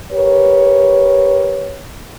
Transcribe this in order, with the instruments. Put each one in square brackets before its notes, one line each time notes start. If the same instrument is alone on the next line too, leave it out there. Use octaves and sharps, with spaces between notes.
[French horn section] G4 A#4 B4 C#5